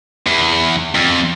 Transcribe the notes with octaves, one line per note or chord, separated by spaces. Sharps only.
E2
F2